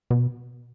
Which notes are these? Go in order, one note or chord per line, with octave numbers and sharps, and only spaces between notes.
B2